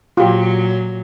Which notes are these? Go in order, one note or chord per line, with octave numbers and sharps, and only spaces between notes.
A#2 F#3 F4 G4